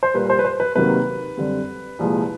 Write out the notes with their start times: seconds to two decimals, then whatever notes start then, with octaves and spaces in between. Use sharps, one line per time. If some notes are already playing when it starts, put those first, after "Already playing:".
0.03 C5
0.14 A#2 G3 A#3 B4
0.30 C5
0.39 B4
0.45 C5
0.60 B4
0.75 C3 D#3 F#3 A#3 B4
1.37 F#2 D3 G3 C4
1.99 C2 A#2 F3 G#3